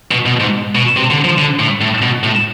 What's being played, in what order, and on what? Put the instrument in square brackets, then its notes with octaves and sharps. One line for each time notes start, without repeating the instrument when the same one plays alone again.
[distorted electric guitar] B2
B2
G#2
B2
C3
D3
F3
D3
A2
A2
B2
A2